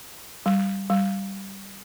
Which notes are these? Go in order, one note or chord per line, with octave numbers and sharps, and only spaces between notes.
G3
G3